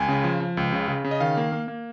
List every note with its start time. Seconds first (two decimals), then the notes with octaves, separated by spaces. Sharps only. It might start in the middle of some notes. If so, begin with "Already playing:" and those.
Already playing: C#2 G#5
0.08 C#3
0.24 F3
0.40 F3
0.57 C#2
0.72 C#3
0.88 C#3
1.04 C#3
1.11 D#5
1.20 D#3 F5
1.37 A#3
1.52 A#3
1.68 A#3